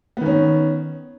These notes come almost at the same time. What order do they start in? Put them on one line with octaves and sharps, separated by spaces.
B3 D#3 C#4